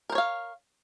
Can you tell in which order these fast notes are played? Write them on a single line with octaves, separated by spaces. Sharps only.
A#4 C5 C#5 F5